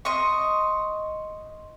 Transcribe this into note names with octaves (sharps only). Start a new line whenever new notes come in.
D#5 C6 C#6